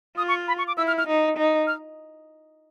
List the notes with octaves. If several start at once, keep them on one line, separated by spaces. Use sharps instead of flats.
F4 D#6
C#6
B5
C#6
D6
E4 E6
F6
F6
D#4
D#4
F6